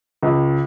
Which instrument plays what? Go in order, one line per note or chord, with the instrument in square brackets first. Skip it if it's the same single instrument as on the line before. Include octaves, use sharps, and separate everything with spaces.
[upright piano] C#2